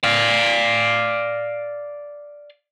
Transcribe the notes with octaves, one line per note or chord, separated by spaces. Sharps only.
D5 F5